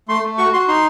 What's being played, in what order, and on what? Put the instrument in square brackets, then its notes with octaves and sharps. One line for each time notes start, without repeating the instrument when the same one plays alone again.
[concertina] A3 C6
A3
F#4 C#6
F#4 C6
D#4 C6